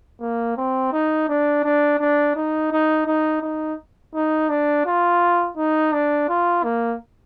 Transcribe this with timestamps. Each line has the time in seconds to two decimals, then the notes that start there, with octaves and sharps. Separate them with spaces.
0.20 A#3
0.57 C4
0.92 D#4
1.29 D4
1.64 D4
2.00 D4
2.36 D#4
2.72 D#4
3.06 D#4
3.42 D#4
4.15 D#4
4.50 D4
4.86 F4
5.57 D#4
5.93 D4
6.29 F4
6.64 A#3